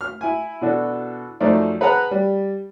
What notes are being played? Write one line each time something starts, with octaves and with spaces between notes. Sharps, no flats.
F6
E4 G#5
B2 E3 D4 F#4 A4
F#2 F3 A3 D#4 C5 D5
G#4 B4 F#5 A5 A#5 F#6
G3